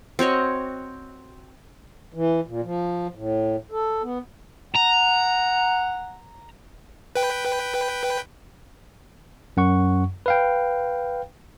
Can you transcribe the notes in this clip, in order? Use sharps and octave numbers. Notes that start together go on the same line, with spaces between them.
C4 F#4 C#5 D#5
E3
A#2
F3
A2
A4
B3
F#5 A#5
B4 G5
F#2 F#5 C#6
B4 F5 G5